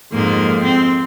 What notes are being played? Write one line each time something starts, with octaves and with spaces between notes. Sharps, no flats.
F2 G#2 A#3
C4